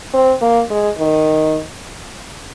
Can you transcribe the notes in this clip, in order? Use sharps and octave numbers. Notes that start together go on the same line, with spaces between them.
C4
A#3
G#3
D#3